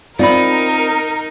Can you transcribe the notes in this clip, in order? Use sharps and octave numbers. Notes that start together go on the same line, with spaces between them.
C4 D#4 F4 A#4 D5 B5